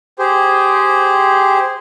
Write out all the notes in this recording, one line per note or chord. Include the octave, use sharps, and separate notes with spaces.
G4 G#4 C5